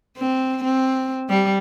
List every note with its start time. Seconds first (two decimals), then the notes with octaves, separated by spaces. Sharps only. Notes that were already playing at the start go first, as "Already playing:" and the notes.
0.18 C4
0.64 C4
1.29 G3